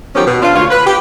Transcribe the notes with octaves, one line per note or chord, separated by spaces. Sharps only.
D#3 F3 F#3 B3 C#4 G4
B2
D4 F4
D2 F4 C#5
B4
G4